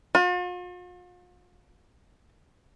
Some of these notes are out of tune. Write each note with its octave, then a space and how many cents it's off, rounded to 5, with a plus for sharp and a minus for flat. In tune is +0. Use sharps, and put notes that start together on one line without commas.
F4 +45